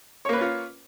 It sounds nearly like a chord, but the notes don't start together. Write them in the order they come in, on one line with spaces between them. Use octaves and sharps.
C#5 A#3 B4 C#4 F4